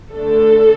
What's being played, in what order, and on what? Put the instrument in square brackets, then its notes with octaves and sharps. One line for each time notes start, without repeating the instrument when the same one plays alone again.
[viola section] D3 A3 D4 A4